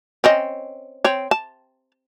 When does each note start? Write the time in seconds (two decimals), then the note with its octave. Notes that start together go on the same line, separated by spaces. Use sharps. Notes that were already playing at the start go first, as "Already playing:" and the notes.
0.24 C4 C#4 D#5
1.05 C4 C#5
1.31 A5